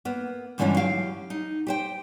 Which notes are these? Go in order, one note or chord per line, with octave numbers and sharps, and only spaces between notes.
A#3 B3
G2 D3 E3 G#3 C#4 F4
F#3 E4 G4 F5
D#4
G4 C5 G5